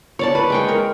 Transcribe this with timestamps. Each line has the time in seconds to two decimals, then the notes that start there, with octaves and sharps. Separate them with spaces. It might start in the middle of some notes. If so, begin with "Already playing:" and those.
0.19 C#5 D5 A5
0.35 B4
0.50 G#3 G5 C#6
0.68 A#4